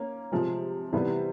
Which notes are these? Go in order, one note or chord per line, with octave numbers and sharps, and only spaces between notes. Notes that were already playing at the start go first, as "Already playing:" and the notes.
Already playing: A#3 C#4
C3 F3 G#3
C3 E3 G3 B3